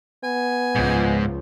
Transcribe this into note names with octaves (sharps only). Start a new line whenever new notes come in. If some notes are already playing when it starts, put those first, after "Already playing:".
B3 G#5
C#2 G#2 F3